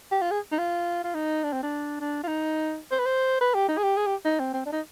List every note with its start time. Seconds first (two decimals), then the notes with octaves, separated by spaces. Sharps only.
0.12 G4
0.22 F4
0.31 G#4
0.52 D#4
0.59 F4
1.04 F4
1.15 D#4
1.43 D4
1.53 C4
1.63 D4
2.00 D4
2.23 F4
2.28 D#4
2.91 C5
2.99 B4
3.06 C5
3.41 B4
3.54 G4
3.68 D#4
3.78 G#4
3.83 G4
3.97 G#4
4.07 G4
4.25 D#4
4.40 C4
4.54 C4
4.66 D4
4.72 D#4